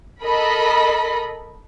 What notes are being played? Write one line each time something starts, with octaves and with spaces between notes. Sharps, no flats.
A4 A#4 D#5 B5